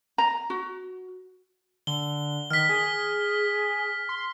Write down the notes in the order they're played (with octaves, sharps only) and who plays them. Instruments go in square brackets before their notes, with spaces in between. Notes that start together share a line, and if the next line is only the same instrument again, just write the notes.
[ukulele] A#5
F#4
[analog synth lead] D3 [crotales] G7
[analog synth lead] D#3 [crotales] F6 B6
[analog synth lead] G#4
C6